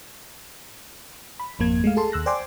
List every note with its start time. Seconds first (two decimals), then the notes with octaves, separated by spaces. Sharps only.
1.40 B5
1.59 G#1 F2 A#3 G#6
1.84 G#3 A3 F5
1.97 G#4 A4 A5 C6
2.12 D#2 E6 F#6 A#6
2.26 C5 D5 G5 G#5 C6 D6